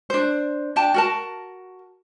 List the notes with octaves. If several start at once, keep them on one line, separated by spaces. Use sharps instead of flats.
D4 C5
D4 G5 A5
F#4 A#4 A5